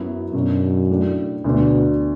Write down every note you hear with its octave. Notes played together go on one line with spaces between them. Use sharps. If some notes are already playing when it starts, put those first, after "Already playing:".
Already playing: F#2 F#3 B3 E4
F#2 B2 F#3 D4
A2 A3 D4
D2 B2 D3 A3 D4